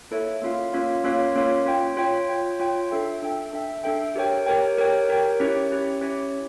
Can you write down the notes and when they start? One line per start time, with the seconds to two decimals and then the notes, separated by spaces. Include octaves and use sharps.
0.11 A#3 E4 A4 C#5 E5
0.42 A#3 C#4 F4 C#5 F5
0.73 A#3 C#4 F4 C#5 F5
1.04 A#3 C#4 F4 C#5 F5
1.35 A#3 C#4 F4 C#5 F5
1.66 F4 C#5 G5
1.97 F4 C#5 G5
2.29 F4 C#5 G5
2.60 F4 C#5 G5
2.91 D4 A4 E5 G5
3.22 D4 A4 E5 G5
3.53 D4 A4 E5 G5
3.84 D4 A4 E5 G5
4.16 G4 A#4 C#5 G5
4.46 G4 A#4 C#5 G5
4.77 G4 A#4 C#5 G5
5.09 G4 A#4 C#5 G5
5.40 C#4 E4 G4 C#5
5.71 C#4 E4 G4 C#5
6.01 C#4 E4 G4 C#5